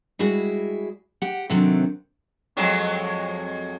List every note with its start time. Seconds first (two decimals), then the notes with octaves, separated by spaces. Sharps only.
0.19 G3 G#3 E4 F#4 G#4
1.22 G4 F#5
1.50 C3 D#3 F#3 A3 C4 D4
2.57 F2 F#3 G#3